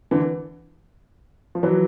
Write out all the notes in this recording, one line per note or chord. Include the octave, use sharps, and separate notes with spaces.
D3 E3
F3
E3 F#3